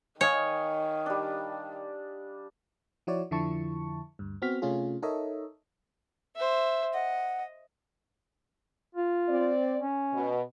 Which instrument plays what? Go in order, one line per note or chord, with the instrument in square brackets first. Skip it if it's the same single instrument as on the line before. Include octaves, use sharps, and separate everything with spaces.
[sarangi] D#3 [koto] C#5 [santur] D#5 F5 G#5
[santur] G3 D4
[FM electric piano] F3 E4 F#4 C#5 D5
F2 D3 F3 E4 A5 C#6
D2 G2
B3 C4 F#4 F6 B6
C3 A3 C#4 F4 G#4
D#4 A4 A#4 C#5 D#5 E5
[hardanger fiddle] C5 E5
[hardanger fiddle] D#5 [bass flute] F#5
[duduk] F4
[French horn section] C4 D5
[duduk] C#4
[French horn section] B2